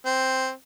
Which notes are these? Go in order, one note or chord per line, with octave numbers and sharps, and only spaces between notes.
C4